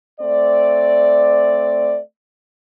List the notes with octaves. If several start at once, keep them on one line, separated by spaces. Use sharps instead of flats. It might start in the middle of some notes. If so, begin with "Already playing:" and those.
A3 C4 D5